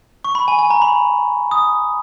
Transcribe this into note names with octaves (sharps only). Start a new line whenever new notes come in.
C#6
B5
G#5
G#5
A#5
B5
D#6